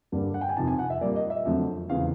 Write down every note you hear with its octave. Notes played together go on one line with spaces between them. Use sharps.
G2 D3 G3 A#3
F#5
G5
G#5
F2 C3 D#3 A5
G#5
F#5
E5
A#2 G3 A#3 D5
D#5
E5
F2 D3 F#3 A3
E2 C#3 F3 G#3 F5